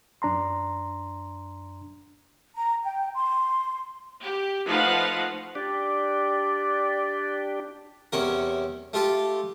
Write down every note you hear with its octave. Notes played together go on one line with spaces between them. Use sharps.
F#2 D4 A#5 C6
A#5
G5
C6
G4
F3 A3 D#4 B4 F5 F#5
D4 G4 D5
E2 C3 C#4 A#4
A3 F4 G4 A4